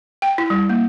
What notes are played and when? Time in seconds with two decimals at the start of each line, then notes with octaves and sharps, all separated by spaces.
0.22 G5
0.38 E4
0.50 G3
0.69 A#3